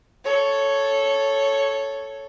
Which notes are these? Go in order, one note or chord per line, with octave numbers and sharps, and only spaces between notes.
A4 C#5